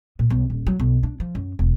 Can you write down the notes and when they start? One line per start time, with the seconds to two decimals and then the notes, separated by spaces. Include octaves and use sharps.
0.19 A#2
0.30 B1
0.50 D#1
0.67 F#3
0.80 B1
1.03 D4
1.20 F3
1.35 F#2
1.59 E1